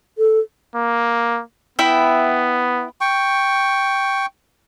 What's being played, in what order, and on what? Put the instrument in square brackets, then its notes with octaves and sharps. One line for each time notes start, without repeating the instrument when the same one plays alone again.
[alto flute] A4
[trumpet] A#3
[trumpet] B3 [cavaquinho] E4 E5 G5
[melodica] G5 C#6